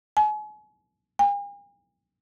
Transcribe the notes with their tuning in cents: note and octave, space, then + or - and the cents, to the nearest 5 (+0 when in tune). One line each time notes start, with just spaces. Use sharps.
G#5 +35
G#5 -45